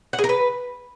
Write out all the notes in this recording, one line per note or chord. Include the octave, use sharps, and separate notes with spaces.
F#5
G#4
A#4
B4